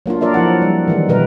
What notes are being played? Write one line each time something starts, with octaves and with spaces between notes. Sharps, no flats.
F#3 A#3 D4 F4
F#3 F4 A#4 D5 E5
F3 E4 F#5
G3
D#3 E3 G#3
B2 G3 A#4 B4